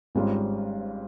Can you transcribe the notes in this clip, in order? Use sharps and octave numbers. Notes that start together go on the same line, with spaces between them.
G#1 G#2 G3 C#4 F4